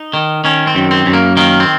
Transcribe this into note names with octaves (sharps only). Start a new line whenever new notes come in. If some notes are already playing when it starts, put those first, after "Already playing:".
Already playing: D#4
D#3
D#3 C#4
C4
F#2
C4
F#2
A#3
D#3 A#3
C4